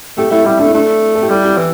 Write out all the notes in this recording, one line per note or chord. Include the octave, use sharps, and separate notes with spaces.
A3 G4
A3 E4
G3 E4
A3 D4
A3 D4
A4
G4
G3 E4
G4
E3